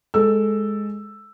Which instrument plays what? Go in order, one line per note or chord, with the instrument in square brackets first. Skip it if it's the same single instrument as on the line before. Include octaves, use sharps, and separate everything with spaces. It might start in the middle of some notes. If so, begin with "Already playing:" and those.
[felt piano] G#3 A4 E6